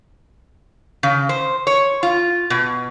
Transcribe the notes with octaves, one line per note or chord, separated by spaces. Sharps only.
C#3
C5
C#5
F4
B2